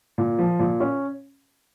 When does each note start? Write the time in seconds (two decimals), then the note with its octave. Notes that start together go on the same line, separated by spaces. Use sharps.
0.18 A#2
0.38 F3
0.59 A#2
0.80 C#4